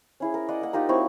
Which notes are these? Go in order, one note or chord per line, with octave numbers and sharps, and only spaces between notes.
C#4 E4 G#4
A#4
D5 D#5 F#5
A#3 F#5
D#4 F4 G4 A#4
F#3 C4 E4 C#6